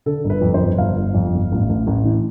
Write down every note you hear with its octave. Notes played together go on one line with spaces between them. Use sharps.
D3 A4
G1
B4
F2
C5
G1
G1 F5
G1
F2
G1
A1
A1
A1
E3